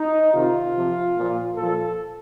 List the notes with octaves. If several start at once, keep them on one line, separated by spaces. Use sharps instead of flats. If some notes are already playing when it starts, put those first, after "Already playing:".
Already playing: D#4
C3 D#3 F4
C3 F3
A#2 F3
A#2 F3 A4